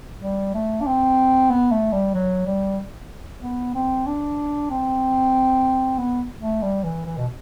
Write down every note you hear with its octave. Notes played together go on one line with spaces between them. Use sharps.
G3
A3
D4
C4
B3
A3
G3
F#3
G3
B3
C4
D4
C4
B3
A3
G3
E3
E3
B2